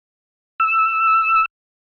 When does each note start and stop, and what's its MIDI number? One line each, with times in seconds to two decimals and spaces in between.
0.60 1.45 88